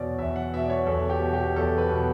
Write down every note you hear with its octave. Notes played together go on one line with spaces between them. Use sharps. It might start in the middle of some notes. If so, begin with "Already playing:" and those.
Already playing: E2 B2 C#5 D5
E2 E5
F#5
B2 E5
D5
C#5
E2 A4
G4
B2
G4
E2 A4
B4
B2